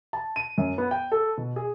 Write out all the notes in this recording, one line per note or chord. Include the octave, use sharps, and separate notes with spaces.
A5
D#7
F#2
B3
G5
A4
B2
G#4